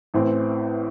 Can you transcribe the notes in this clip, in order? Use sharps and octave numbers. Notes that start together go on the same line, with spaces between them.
A1 A2 E3 C4